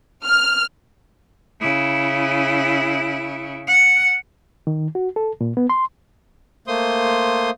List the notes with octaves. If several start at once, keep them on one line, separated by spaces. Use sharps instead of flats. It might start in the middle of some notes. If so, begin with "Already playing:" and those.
F6
C#3 E4
F#5
D#3
F#4
A4
A#2
B3
C6
A3 A#3 C5 C6 D#6